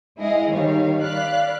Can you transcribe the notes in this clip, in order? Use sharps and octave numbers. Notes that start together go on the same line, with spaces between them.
G#3 E4 G#4 D#5 F5
D#3 G3 C#5 F5
D5 F5 B5 F#6